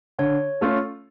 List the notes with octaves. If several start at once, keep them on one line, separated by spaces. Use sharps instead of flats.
D3 C#5
A3 C#4 F4 A4